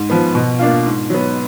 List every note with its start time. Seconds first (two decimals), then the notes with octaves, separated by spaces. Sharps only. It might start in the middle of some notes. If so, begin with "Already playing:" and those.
Already playing: G#2
0.10 F3 B3
0.35 B2
0.59 A#3 D4 F4
0.85 G#2
1.10 F#3 B3